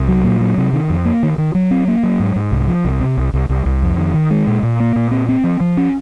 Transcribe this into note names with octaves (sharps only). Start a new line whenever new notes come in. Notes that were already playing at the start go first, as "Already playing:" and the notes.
Already playing: C2
F#3
A#2
F#3
C3
D#3
F2
A#3
D#3
D#3
F#3
C4
A#3
F#3
G#2
G#2
C2
F3
C2
C3
C2
C2
C2
C2
F2
D#3
D#3
G#3
A#2
A#2
A#3
A#2
C4
C4
F3
F3
C#4